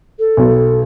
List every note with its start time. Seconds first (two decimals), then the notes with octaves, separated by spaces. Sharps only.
0.19 A4
0.37 B1 B2